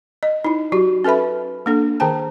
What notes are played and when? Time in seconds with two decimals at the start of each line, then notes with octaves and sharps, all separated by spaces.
0.23 D#5
0.44 D#4 E4
0.72 F#3 F#4 G4
1.04 C#4 A4 B4 E5 B5
1.66 A#3 D4 A4
2.00 D#3 G#4 C5 G5 A5